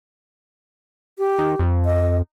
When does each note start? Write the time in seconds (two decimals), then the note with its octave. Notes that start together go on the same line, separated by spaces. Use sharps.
1.19 G4
1.39 D#3
1.59 F2
1.85 D#5